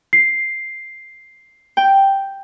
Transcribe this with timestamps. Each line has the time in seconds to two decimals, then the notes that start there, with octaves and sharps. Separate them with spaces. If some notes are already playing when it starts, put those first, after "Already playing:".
0.13 C7
1.77 G5